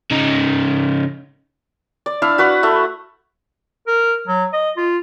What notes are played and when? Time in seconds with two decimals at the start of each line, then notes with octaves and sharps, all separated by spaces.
0.11 C#3 D#4
2.06 D5
2.22 D4 E4 F5
2.38 F#4 B4 F#5 C#6
2.63 A3 E4
3.87 A#4
4.27 F#3
4.53 D#5
4.77 F4